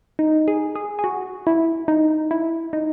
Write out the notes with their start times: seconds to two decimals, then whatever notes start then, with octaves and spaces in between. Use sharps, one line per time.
0.19 D#4
0.48 G#4
0.75 G#4
0.99 G#4
1.04 F#4
1.47 E4
1.88 D#4
2.31 E4
2.73 D#4